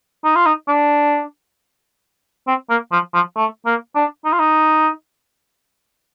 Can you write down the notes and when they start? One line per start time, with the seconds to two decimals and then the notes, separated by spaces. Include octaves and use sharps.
0.24 D#4
0.36 F4
0.46 D#4
0.68 D4
2.47 C4
2.70 A#3
2.92 F3
3.14 F3
3.36 A3
3.66 A#3
3.95 D4
4.25 D#4
4.32 F4
4.39 D#4